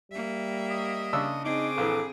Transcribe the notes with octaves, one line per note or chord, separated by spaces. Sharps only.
G3 A#3 E5
D#5
C#3 D4 E6
C4 D#4 G#4 D6
A#1 E3 A4